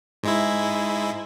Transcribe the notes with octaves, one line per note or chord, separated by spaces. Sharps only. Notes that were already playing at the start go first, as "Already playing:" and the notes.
G#2 G#3 E4